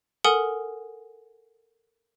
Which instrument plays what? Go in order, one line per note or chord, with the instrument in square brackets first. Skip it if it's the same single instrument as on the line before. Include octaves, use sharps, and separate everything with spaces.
[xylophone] A4 A#4 F#5 G#5 D#6